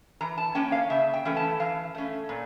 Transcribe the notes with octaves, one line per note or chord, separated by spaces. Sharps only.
E3 A#5
A5
A#3 C#4 G5
F5
C#3 E5
G5
E3 A3 C#4
A5
E3 F5
A3 C#4
A#2